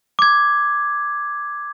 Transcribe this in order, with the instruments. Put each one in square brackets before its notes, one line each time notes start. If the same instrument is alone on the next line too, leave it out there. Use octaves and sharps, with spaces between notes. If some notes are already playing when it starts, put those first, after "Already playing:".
[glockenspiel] D6 G#6